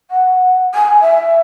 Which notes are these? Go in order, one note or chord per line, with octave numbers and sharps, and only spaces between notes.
F#5
G#5
E5